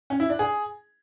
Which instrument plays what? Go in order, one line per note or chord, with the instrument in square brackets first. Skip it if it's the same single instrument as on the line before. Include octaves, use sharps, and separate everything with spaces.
[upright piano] C#4
E4
D4
G#4